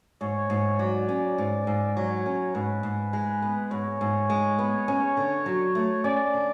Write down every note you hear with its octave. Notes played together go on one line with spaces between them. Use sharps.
G#2 C#5
G#2
F#3 D5
C#4
G#2
G#2
F#3 C#5
C#4
G#2 B4
G#2
G#3
B3
G#2 C#5
G#2
G#3
B3
C#4
D3
F#3
A3
C#4 D5
D3